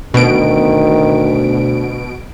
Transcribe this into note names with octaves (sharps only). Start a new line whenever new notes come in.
D2 B2 D#3 D7